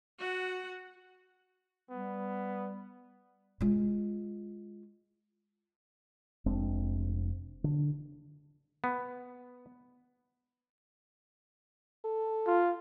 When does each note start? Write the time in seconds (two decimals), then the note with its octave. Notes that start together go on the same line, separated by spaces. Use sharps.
0.19 F#4 F#5
1.90 G3 B3
3.61 G#3 F4
6.46 F1 G#3 C4 D4
7.64 D3
8.84 B3
12.05 A4
12.47 F4